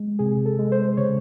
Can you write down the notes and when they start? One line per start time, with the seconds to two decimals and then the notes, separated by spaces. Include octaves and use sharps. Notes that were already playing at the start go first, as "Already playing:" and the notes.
Already playing: G#3
0.19 C3 G#4
0.46 A4
0.59 G#3
0.72 C5
0.97 C#3 C#5